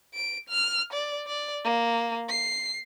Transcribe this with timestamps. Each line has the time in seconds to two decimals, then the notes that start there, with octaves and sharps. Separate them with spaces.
0.14 D7
0.50 F6
0.93 D5
1.28 D5
1.64 A#3
2.29 C7